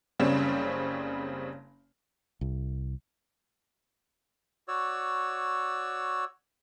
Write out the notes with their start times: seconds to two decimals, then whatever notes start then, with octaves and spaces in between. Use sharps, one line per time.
0.20 F#1 C#3 G3 C4 C#4 E7
2.41 C2
4.68 F#4 C#5 D5 E6